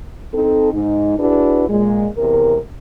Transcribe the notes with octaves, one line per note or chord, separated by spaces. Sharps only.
C4 D#4 A4
G#2 D#4
D4 E4 F#4 G#4 B4
A#2 G#3
E2 C3 A#4